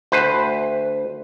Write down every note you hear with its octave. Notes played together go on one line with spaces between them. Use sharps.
D2 B4 C5